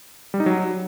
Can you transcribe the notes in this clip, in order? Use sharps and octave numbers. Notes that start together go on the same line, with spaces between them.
G3
D#4
F#3